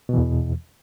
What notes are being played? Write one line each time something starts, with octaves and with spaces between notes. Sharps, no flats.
E2 B2 E3